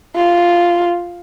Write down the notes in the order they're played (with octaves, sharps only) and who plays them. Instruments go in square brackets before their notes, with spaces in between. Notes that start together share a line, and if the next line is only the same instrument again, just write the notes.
[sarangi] F4